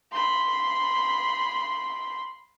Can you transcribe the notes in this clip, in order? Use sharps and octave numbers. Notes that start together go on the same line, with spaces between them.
B5 C6